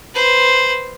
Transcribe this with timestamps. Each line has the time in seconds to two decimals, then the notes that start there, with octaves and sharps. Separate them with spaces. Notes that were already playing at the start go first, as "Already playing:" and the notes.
0.14 B4 C5